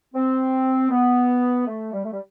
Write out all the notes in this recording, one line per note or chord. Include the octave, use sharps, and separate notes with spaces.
C4
B3
A3
G3
A3
G3